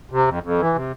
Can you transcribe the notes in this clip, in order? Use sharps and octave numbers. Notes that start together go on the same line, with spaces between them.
C3
F2
F2
E3
C3